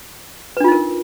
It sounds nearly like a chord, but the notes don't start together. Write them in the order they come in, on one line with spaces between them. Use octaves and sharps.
B4 D4 F4 D#4 A#4